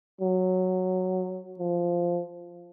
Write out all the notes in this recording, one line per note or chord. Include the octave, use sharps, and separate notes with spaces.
F#3
F3